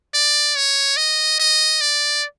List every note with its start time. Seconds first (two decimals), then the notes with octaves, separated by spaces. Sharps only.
0.14 D5
0.56 C#5
0.97 D#5
1.40 D#5
1.81 D5